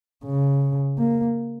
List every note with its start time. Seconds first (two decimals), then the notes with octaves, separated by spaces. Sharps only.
0.24 C#3
0.98 A#3